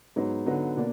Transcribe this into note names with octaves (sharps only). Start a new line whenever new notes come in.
G#2 F#3 B3 D#4
D3 F#3 B3 D#4
B2 A#3 D4